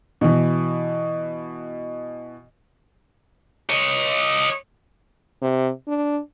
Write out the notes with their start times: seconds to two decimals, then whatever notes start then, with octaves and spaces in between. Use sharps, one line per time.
0.21 B2 E3
3.70 C#5 D#5
5.42 C3
5.88 D4